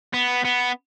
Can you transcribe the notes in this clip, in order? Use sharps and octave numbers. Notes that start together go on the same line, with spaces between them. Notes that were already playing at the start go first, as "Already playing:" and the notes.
B3
B3